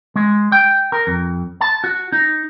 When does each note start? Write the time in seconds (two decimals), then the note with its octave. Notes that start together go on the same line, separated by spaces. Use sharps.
0.16 G#3
0.52 G5
0.92 A#4
1.07 F2
1.61 A5
1.84 F#4
2.12 D#4